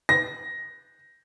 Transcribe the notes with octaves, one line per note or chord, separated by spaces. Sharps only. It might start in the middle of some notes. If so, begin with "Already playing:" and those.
A#6